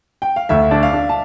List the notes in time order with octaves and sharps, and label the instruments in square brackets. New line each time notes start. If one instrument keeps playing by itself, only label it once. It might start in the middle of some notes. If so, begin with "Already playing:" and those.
[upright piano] G5
F5
[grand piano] D2 [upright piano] E5
[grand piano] D4
[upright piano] F5
[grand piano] D4
[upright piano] A5